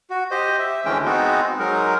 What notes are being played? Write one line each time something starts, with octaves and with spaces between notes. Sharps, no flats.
F#4
G4 C5 D#5
E5
D2 E3 G#3 C#4 G5
G#3 B3 C4 D#4 F#4
F#3 G#3 D#4 A#4